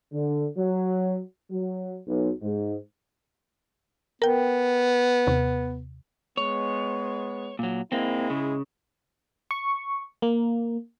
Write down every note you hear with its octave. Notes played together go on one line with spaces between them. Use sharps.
D3
F#3
F#3
B1
G#2
B3 A#4 G5
D#2 C3
G#3 B3 C#5
A#2 F#3
G#2 G#3 A#3 C4 E4
C#3
C#6
A#3